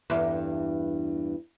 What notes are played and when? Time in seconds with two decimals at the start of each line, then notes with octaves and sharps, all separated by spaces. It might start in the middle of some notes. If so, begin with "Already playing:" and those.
0.10 E2 G2